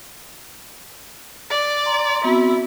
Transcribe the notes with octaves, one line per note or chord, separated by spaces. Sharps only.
D5
A#5 C6
B3 C4 E4 F#4